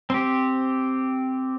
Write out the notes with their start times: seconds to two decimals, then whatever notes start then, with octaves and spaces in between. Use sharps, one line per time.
0.10 C4 G4